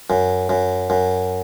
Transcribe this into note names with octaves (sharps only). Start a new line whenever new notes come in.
F#2
F#2
F#2